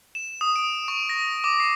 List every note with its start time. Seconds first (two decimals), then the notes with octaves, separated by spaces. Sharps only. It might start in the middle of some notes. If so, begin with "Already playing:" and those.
0.15 E7
0.41 D#6
0.56 D7
0.88 C#6
1.09 A#6
1.44 D6
1.60 C7